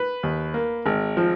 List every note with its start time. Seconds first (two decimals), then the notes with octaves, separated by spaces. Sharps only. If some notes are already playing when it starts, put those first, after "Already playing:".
Already playing: B4
0.23 D#2
0.54 A#3
0.86 G#1
1.17 F3